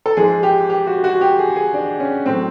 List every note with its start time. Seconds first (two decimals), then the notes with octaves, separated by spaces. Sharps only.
0.06 A4
0.17 G#2 F3 G#3 G#4
0.43 G4
0.70 G4
0.87 F#4
1.04 F#4
1.21 G4
1.39 G#4
1.56 G#4
1.74 D4
2.00 C#4
2.26 A2 F#3 A3 C4